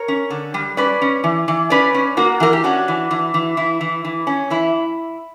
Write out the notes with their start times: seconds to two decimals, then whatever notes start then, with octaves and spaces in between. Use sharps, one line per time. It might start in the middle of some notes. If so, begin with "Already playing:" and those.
Already playing: A#4 C#5
0.08 C#4
0.30 D3
0.54 G3
0.77 C#4 B4 D5
1.02 C#4
1.24 E3
1.48 E3
1.70 C#4 B4 D5
1.94 C#4
2.17 A#3 F#4 A#4
2.40 E3 A#4
2.53 G4
2.64 C#4 D4 F#4
2.88 E3
3.11 E3
3.34 E3
3.57 E3 E4
3.81 E3
4.05 E3
4.27 C#4
4.50 E3 E4